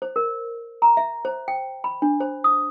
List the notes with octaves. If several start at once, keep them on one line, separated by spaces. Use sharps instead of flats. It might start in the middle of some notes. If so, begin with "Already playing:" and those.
C5
A#4
A#5
E5
C5
G5
B5
D4
C5
D#6